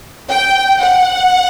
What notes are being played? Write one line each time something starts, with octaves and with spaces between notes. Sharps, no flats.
G5
F#5